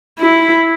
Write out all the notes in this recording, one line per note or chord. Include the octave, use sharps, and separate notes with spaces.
E4